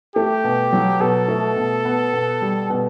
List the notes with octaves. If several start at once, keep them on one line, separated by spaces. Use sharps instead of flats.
A3 G4
B2
F#3
B2 A4
A3
B2
B3
B2
G3
B2